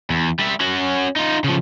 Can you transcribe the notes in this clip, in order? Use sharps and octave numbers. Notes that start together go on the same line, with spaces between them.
E2
G3 E5
C#4 F#4
D#4 F4
C#3 F3